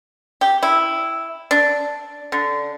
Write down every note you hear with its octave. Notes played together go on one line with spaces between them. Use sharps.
G4
E4
D4
D3